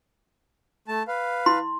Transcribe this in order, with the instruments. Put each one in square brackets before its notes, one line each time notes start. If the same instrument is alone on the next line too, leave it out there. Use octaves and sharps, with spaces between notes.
[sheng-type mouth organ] A3 A5
B4 F5
[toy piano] E4 C6